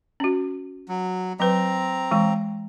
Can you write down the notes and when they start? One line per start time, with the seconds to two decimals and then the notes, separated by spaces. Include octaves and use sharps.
0.20 C#4 F#4
0.88 F#3
1.40 F#3 C4 B4 A#5
2.11 E3 G#3 G5